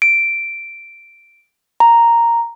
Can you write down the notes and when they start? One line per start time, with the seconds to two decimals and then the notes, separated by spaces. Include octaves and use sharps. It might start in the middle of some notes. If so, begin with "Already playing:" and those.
0.02 D7
1.80 A#5